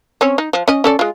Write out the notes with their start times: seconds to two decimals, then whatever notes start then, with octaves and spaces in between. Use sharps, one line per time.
0.21 C4 C#4 C#5
0.38 D#4
0.53 F3
0.68 C#4 D#5
0.84 C#4 A4 D5
0.99 G#3 F4